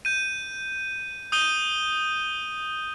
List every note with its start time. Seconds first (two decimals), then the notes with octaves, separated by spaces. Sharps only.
0.05 G6 D#7
1.32 D#6 G6 D#7 G7